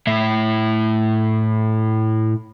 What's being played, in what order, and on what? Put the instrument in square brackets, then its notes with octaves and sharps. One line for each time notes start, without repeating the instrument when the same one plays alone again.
[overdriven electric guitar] A2 E4